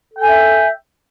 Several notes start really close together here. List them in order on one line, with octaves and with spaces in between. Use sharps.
A4 G5 G#5 E5